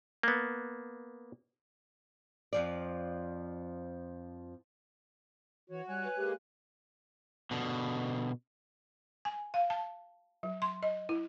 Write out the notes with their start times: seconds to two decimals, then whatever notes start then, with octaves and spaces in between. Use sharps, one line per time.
0.23 A#3 B3
2.53 F2 F3 D5
5.70 E3 F#4 C#5
5.88 G3 C#5 G#5 F#6
6.03 B4
6.16 G#3 A#3 G4
7.51 B2 D3
9.25 G#5
9.54 F5
9.70 A5
10.43 F#3
10.62 C6
10.83 D#5
11.09 E4